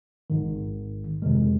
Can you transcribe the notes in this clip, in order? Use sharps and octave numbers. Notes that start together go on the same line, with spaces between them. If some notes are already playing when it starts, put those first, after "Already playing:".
A1 G#2 D#3
F2 C3 D#3 G#3